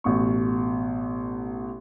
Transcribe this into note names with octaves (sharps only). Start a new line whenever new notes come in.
A1 B2 C#6